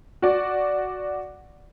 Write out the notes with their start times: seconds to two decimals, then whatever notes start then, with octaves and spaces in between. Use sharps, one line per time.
0.22 F#4 D5